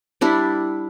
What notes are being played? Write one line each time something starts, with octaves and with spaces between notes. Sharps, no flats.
G3 D4 E4